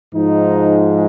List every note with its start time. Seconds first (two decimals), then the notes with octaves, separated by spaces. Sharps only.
0.15 G#2 F3 G#3 D#4